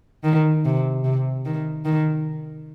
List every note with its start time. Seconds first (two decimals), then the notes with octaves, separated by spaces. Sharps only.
0.24 D#3
0.65 C3
1.04 C3
1.45 D#3
1.85 D#3